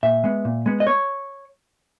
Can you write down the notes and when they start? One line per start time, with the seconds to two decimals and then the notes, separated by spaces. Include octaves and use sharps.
0.03 A#2 E5
0.24 G#3 B3
0.45 A#2
0.66 G#3 B3
0.80 D#5
0.87 C#5